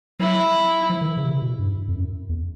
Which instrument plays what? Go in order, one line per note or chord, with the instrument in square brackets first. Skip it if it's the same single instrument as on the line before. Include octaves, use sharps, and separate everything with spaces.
[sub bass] F#3 [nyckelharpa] E4
[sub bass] F3
D#3
E3
C#3
C3
B2
G2
F2
F#2
E2